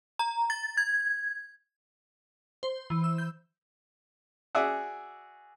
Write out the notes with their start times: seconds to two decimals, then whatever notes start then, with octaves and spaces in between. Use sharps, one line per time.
0.19 A#5
0.50 A6
0.77 G#6
2.63 C5
2.90 E3
3.04 E6
3.18 G6
4.55 F#4 G#4 D5 E5 F#5